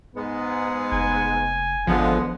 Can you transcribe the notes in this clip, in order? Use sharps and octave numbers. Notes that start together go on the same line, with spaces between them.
G#2 G#3 B3
F1 G#5
G#1 D3 F3 G#3 B3